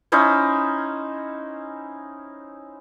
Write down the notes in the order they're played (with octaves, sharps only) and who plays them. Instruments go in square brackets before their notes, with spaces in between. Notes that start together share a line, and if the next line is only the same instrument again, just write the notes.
[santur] C#4 D#4 E4 C5